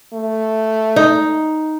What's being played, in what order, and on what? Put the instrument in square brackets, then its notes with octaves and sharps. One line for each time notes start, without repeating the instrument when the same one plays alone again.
[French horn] A3
[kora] D#4